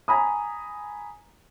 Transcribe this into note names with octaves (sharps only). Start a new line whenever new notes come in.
G#5 A#5 B5 D#6